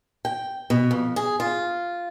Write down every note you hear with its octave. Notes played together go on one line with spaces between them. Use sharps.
G5
B2
F2
G#4
F4